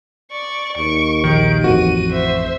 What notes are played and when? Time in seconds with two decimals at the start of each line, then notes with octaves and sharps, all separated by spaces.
0.31 D5 C#6
0.77 D#2 C#6 D7
1.24 A#1 D#3 D7
1.64 A1 F2 F#4 D#7
2.12 C5 E5